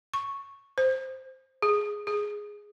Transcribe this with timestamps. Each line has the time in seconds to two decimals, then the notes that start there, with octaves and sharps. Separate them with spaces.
0.14 C#6
0.78 C5
1.62 G#4
2.07 G#4